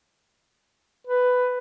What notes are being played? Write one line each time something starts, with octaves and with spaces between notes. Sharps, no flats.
B4